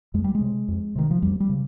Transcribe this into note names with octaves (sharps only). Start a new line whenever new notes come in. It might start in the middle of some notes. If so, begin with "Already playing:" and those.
F2 G#3
G3
G#3
C3
F2
C3 D#3
F3
F2 G3
G3
C#3